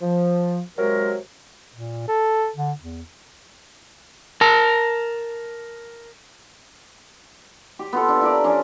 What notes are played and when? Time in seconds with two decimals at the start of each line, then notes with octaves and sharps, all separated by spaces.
0.01 F3
0.78 C3 F#3 G#3 F#4 A#4
1.74 A#2
2.08 A4
2.56 D3
2.81 E2
4.41 A#4 A5
7.79 G4
7.93 B3 F4 A4
8.08 D4
8.21 E4 G4 A#4 D5
8.44 F3 C#4 D4